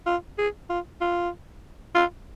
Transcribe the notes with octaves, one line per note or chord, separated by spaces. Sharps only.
F4
G#4
F4
F4
F4